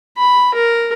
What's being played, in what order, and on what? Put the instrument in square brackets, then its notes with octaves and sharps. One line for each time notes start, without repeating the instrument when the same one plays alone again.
[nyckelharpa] B5
A#4